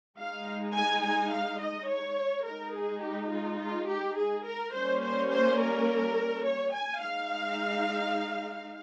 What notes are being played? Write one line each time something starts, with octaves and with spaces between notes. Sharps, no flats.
G#3 D#4 F5
G#5
G#5
F5
D#5
C#5
G#3 D#4 A#4
G#4
G4
F4
F4
G4
G#4
A#4
G3 A#3 C#4 C5
C5
C5
A#4
C#5
G#5
G#3 D#4 F5